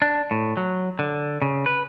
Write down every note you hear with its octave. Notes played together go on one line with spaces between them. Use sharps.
D4
A2
F#3
D3
C#3
B4